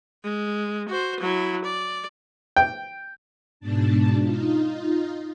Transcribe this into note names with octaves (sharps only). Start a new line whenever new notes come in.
G#3
F#4 C5
F#3 E4
D5
G5
G#2 B2 D4 A5
D#4 F4